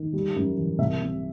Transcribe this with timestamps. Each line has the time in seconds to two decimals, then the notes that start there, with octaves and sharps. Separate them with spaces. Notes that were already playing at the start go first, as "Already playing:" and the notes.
Already playing: D#3
0.13 G3
0.36 F#2
0.56 E3
0.78 C2 E5
1.01 C3